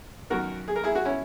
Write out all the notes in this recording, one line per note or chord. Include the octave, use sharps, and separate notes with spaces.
F#2 D#3 F#4 A#4
G#4
A#4
E4 G#4
F#4
C#4 E4